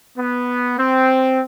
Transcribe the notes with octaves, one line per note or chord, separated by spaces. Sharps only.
B3
C4